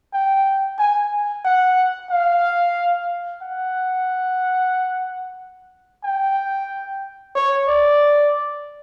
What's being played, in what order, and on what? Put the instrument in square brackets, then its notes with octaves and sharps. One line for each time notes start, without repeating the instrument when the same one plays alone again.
[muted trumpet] G5
G#5
F#5
F5
F#5
G5
C#5
D5